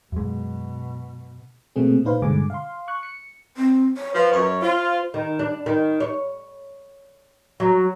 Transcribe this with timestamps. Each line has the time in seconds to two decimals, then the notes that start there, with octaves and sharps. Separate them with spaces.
0.12 F#2 B2 G#3
1.76 B2 A3 A#3 C4 G#4
2.05 A#2 D#4 B4 C5 F5
2.22 G2 B2 D3 G#3 G#5 D6
2.50 F5 C6
2.88 C#6 F#6
3.03 C#7
3.57 C4
3.97 C#5
4.14 F3 B4
4.32 F#2 C#5
4.62 F4 C5
5.14 D#3
5.39 D4
5.66 D#3
6.00 C#5
7.60 F#3